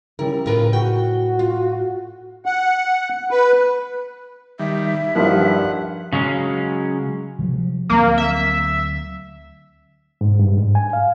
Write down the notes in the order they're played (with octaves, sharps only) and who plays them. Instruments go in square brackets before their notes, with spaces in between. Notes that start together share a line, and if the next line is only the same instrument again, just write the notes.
[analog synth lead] C#3 [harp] G3 E4 [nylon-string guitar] A#4
[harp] A2 [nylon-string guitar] F4 A#4 B4
[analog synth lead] F#4 [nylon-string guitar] G5
[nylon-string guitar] F4
[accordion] F#5
B4
[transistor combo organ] D#3 G3 [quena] E5
[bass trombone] G2 [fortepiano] D#3 F3 E4 [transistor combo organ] F#5
[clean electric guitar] C#3 F#3 G#3 C#4
[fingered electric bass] C3 F3 F#3
[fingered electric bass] D2 F#3 C4 [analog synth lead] A#3
[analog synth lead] E5
[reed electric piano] G#2
G2
G#2
G#5
F5